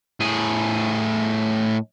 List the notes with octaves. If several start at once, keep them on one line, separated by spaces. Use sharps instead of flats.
A2 G#4